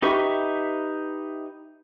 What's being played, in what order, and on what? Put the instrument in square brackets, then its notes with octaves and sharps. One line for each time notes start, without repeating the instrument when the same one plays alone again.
[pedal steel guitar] D#4 G4 B4 E5 C#6